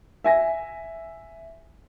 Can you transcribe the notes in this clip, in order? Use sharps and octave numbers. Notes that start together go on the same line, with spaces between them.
E5 G#5 A#6